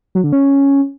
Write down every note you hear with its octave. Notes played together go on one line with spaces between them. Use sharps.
F#3
D3
C#4